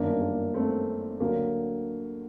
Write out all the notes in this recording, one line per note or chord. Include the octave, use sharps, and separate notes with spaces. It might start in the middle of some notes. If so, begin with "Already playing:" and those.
Already playing: G1 F#2 D#3 A#3 D4
A#3
A3 C4
D2 D3 F#3 A#3